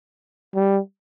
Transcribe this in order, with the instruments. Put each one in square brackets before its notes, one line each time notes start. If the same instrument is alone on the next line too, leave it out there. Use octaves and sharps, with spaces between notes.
[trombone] G3